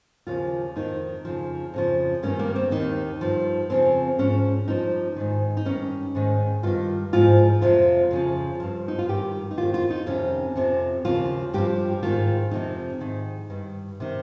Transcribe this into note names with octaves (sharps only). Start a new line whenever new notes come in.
D#2 C#3 F3 F4
F2 D#3 D#4
F2 C#3 F3
F2 C#3 F3
G2 D#3 C#4
A#3
C4
D#2 D#3 D#4
G2 F3
F2 C#3 F3 C4
G#2 F3 C#4
G2 F3 D#4
G#2 D#3
D#4
G2 D#3 C#4
G#2 D#3
G2 D#3 F4
G#2 F3 F4
F2 C3 F3 F4
F2 C#3 F3
G2 F3
D#4
F4
G2 D#3 G4
D#4
F2 D#3 F4
F4
D#4
F2 C3 D#3 C#4
F2 C3 F3
D#2 C#3 F3 F4
G2 F3 G4
G#2 D#3 F4
F2 C3 F3 D#4
G#2 D#3
G2 D#3
C3 D#3